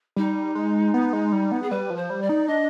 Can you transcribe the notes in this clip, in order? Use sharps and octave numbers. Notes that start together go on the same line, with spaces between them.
G3 D#4
G#3
B3
G#3
G3
B3
G#4
G3 B4
F3
C5
G3
D5
D#4
D4 D#5